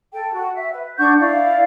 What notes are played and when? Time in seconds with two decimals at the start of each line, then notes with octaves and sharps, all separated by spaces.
0.12 A4 G5
0.34 F#4
0.53 E5
0.70 B4
0.98 D4 F#5 C#6 G6
1.19 E4 D5 F5